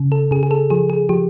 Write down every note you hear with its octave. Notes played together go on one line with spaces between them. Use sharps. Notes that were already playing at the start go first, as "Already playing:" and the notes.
Already playing: C#3
A4
C#3 G#4
G#4
A4
F3 G#4
G#4
F3 G4